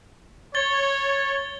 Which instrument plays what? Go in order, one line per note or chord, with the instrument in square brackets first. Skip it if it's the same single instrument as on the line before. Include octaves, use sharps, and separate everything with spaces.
[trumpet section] C#5 [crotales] A6 G7